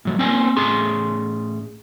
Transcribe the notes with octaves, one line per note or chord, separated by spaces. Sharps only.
A2 F#3
A#3 C4 C#4 C5 G5 G#5
A2 C#4 G#4 C6